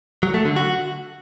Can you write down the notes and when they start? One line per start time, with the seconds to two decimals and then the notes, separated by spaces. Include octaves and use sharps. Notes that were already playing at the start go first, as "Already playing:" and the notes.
0.23 F#3
0.34 A3
0.45 D3
0.56 F#4